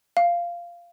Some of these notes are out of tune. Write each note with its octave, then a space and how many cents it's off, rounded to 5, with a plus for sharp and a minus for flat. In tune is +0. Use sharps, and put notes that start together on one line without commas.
F5 -10